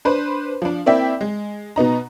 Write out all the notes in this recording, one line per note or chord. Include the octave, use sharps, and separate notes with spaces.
D4 B4 C5
F3 D4
A#3 C4 E4 D5 E5 G5
G#3
B2 B3 D#4 A#5